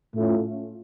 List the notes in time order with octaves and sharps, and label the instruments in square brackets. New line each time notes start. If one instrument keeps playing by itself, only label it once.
[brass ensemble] A2 A3 C#4 F4